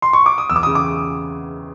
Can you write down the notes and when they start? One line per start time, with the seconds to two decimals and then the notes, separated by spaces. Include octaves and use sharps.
0.02 C6
0.13 C#6
0.26 D6
0.38 D#6
0.50 E2 E6
0.56 D6
0.63 C#3 D#6
0.75 D6